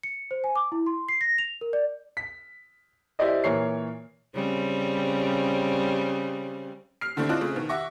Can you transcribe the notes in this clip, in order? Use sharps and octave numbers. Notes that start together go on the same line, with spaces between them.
C#7
C5
G#5
D6
E4
C6
C7
A#6
F7
A#4
D5
B6
E4 G4 C5 D5 D#5
A#2 E3 A#4 C#5 C7
C#3 G3 C4
F6 C7
A2 D3 A3 C4 D4 E4
C4 F4 D5 D#5 A5 F#6
C#3 A3 C4
B2 D#3
E5 F#5 C#6 D6 A#6